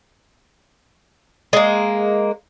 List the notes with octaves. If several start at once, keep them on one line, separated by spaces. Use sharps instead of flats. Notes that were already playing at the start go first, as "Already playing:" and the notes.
G#3 A#3